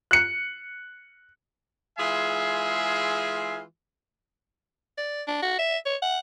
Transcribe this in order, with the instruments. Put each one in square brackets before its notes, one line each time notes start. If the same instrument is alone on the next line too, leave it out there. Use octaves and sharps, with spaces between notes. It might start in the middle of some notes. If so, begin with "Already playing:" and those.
[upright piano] F#6 C#7
[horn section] E3 G#3 F4 G#4 E5 G#5
[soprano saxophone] D5
D4
F#4
E5
C#5
F#5